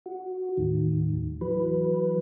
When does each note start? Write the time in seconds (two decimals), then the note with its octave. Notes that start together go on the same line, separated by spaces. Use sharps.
0.06 F#4
0.57 D#2 A2 D#3
1.41 E3 F#3 B4